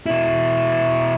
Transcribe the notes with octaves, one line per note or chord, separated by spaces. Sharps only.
B2 E4